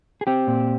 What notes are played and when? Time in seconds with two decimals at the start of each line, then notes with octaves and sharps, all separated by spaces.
0.21 G#4
0.27 C4 G4
0.47 A#2